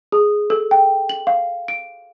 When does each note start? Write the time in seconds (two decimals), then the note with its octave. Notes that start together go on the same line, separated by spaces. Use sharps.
0.12 G#4
0.50 A4
0.71 G5
1.09 F#7
1.27 F5
1.68 D7